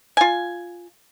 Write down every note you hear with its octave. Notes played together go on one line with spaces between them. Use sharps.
F4 G#5